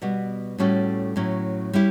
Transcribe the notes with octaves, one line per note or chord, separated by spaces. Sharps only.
B2 G3 B3 F#4
A2 G3 C#4 F#4 A4
A2 F#3 C#4 E4
G3 C#4 E4 G4